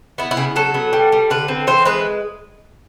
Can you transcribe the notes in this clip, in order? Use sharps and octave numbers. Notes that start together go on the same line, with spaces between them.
B3 E4
E4
C#3
F#3 A4
B3
G3
G3
D3 B4
C4
E3 C5
G#3 B4